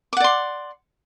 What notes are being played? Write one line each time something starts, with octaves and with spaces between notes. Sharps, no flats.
D5 F#5 C6 D6